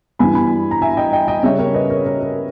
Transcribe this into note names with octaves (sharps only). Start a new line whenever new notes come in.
G2 E3 G3 B3 G#5 B5
G#5 B5
A#5
E5 G#5
D#5 G5
D#5 G5
D#5 G5
C#3 G3 C#4 C#5 E5
A#4 C#5
B4 D#5
A#4 C#5
A#4 C#5
A#4